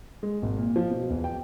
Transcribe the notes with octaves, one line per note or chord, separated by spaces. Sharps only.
G#3
G#1
A#2
F3
B2
E2
G5